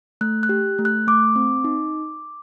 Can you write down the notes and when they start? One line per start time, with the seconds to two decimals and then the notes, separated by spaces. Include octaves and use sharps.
0.21 A3 F#6
0.43 F#6
0.49 G4
0.78 A3
0.85 F#6
1.07 A3 D6
1.36 C4
1.64 D#4